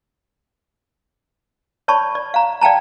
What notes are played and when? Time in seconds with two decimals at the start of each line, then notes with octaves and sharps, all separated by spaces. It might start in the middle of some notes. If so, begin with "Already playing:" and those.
1.88 C#5 D5 A5 B5 C#6
2.15 D5
2.34 F5 A#5
2.61 D5 F5 G5 A5 A#5